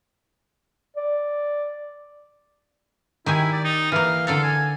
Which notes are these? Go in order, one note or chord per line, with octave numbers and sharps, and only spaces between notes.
D5
D#3 E4 G4 G#5
D5
D#4
E3 A#3 F5
D3 A4 F5 A#5
G#5